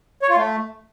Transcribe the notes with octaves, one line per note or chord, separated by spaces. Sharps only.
C#5
F4
A3